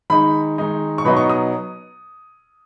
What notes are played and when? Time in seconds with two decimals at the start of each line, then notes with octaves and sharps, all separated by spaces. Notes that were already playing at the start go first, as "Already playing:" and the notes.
0.10 D#3 G#3 D#4 B5
0.58 D#3 G#3 D#4
0.98 C#6
1.05 B2 F#3 B3 D#4 B5
1.17 C#6
1.29 D#6